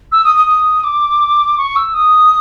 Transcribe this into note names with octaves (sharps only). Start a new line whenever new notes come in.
E6
D#6
D#6
D#6
D6
C#6
E6
D#6